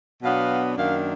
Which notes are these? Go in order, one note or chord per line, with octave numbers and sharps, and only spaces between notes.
B2 F#3 B3 D4 F5
F#2 D#3 A#3 D4 F5